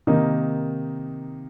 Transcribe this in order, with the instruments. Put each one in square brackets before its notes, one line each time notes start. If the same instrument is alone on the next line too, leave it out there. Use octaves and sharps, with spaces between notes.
[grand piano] C3 D#3 A#3 D#4